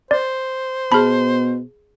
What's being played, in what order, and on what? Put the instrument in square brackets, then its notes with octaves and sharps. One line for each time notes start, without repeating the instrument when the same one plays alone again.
[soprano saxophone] C5 [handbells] D5
[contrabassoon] B2 [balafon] G#4 A5 [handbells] B5